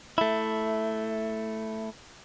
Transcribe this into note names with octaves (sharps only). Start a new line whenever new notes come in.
A3 E4